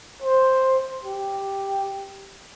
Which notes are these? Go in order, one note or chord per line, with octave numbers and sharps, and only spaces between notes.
C5
G4